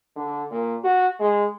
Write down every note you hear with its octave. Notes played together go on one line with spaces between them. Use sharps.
D3
A#2
F#4
G#3